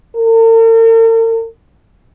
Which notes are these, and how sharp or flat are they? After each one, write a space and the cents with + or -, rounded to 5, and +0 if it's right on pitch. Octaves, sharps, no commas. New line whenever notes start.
A#4 -45